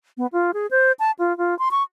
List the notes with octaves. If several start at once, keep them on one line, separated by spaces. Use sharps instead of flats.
B3
F4
G#4
C5
A5
F4
F4
C6
C#6